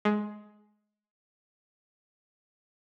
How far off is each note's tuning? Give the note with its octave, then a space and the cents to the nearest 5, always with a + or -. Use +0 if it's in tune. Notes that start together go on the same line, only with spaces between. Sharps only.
G#3 +15